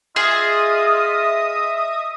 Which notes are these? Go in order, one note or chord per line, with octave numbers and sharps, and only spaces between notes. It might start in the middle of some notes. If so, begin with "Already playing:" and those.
F4 G#4 D#5 E5 D#6